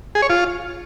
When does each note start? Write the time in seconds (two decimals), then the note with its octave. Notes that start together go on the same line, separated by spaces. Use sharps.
0.15 G#4
0.22 C#5
0.30 F4